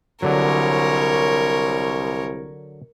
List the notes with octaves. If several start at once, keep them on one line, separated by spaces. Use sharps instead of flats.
C2 D3 F#3 A#4 C#5